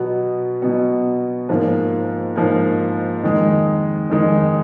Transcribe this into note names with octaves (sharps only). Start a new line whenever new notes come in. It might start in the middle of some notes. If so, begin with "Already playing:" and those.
Already playing: B2 F#3 B3
B2 F#3 B3
G#2 F3 A#3
G#2 F3 A#3
F2 D#3 G#3
F2 D#3 G#3